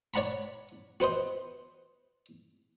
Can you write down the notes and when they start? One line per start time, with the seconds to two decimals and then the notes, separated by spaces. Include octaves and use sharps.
0.14 C#5 D5 F#5 A#5 B5
1.00 F#4 B4 C5 D#5